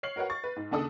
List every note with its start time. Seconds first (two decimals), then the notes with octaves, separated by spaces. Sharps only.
0.03 C#5 F6 C7 F#7
0.16 F#4 A#4 B4 C#5 F#5
0.30 C#6 A6
0.44 B4
0.56 G#2
0.71 D#2 C#3 D4 A4 D#6